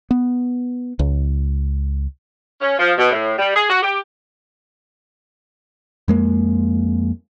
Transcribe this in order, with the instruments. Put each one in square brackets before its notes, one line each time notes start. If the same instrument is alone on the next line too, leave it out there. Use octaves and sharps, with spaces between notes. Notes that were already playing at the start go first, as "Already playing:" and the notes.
[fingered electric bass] B3
C#2
[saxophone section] C#4
F3
B2
A2
G3
G#4
F#4
G4
[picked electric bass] F2 G#3 A#3